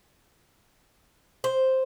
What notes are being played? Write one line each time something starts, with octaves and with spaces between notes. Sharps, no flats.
C5